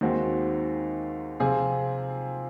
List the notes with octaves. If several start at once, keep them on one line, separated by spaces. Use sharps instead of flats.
D#2 D#3 G#3 C4 F#4
C3 F3 C4 F4 G#4